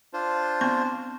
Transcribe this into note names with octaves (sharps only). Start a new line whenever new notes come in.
D4 F4 C5
B3 C4 C#6